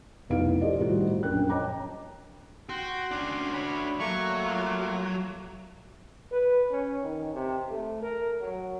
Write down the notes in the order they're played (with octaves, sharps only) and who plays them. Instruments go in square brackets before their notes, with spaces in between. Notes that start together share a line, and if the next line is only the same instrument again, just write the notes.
[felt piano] F1 B1 B3 E4 F5 D7
G4 A4 C5 D5 D#5
A2 D#3 G3 D#4 F#4 C5
A#1 F#2 A#4 G5 F#6
C#5 D#5 G5 A5 A#5 D6
[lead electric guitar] F#4 [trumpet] G5 [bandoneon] C6
[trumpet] C#4 [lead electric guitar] D4 F#4
[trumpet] C#5 [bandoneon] B5
[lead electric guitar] F#3 [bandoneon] A3 A#3 [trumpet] C#6
[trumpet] F4
[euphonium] B4
C#4
D#3
C3
A3
A#4
F#3